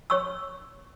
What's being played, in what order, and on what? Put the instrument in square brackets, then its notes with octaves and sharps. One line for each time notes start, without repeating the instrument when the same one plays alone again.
[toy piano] C#5 C#6 E6